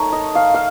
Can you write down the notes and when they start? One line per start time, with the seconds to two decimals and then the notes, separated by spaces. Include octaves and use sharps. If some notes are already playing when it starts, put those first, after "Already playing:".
Already playing: A3 D#4 A#4 C#5
0.12 D#5
0.35 F5
0.54 F5